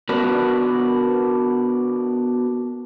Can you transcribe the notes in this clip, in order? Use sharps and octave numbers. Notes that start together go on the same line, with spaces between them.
B3 D4 F#4 A#4 B4